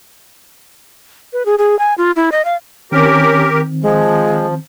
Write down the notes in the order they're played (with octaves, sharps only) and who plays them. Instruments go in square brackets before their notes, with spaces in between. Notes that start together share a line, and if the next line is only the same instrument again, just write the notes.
[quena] B4
G#4
G#4
G#5
F4
E4
D#5
F5
[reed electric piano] D#3 C4 [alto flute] C#4 [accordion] G4 A#4
[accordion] F3 [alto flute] G#3